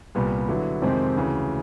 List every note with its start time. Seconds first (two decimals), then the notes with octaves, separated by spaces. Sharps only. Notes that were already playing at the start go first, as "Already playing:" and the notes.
0.15 C2 A#2 G3 B3
0.49 D3 F#3 B3 E4
0.82 F2 C3 D#3 G#3 C4
1.15 D2 C#3 E3